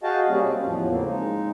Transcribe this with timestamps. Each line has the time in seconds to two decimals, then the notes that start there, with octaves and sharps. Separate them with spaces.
0.03 F#4 G#4 D#5 F5 G5 A5
0.29 C3 G3 A#3 C#4 G#4
0.45 C4
0.64 E2 A2 F3
0.89 C#3 A#3 C4
1.06 G#3 D#4